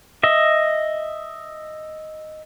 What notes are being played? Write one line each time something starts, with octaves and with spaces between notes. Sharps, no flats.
D#5 E5